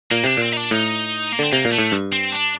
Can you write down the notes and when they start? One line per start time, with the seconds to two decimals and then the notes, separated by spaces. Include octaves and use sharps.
0.11 A#2 A#3
0.24 C3 D4
0.37 A#2 C4
0.52 D#4
0.57 D4
0.71 A2 D#4
1.32 A#3
1.39 D3 C4
1.52 C3 A#3
1.65 A#2
1.72 A3
1.79 A2
1.92 G2
2.12 C4
2.32 D4